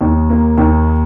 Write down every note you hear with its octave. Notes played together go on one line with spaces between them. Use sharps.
D#2
A#3
D#2